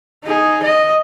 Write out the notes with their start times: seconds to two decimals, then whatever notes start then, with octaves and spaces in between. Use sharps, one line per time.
0.24 D#4 G#4
0.63 D#5